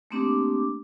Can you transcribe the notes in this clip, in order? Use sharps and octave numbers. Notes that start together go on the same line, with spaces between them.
A3 A#3 C4 D4 G4 D6